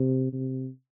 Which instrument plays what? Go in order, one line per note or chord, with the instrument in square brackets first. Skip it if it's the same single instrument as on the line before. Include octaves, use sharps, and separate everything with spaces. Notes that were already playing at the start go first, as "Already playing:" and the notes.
Already playing: [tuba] C3
C3